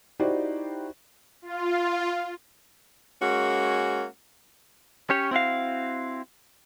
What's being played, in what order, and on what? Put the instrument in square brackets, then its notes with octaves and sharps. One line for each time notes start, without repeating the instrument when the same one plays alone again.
[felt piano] D#4 E4 F#4 G4 C5 D5
[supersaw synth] F4
[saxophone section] G#3 A#3 C#4 F#4
[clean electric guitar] C#4 G4 C#5
C4 E4 F#4 F5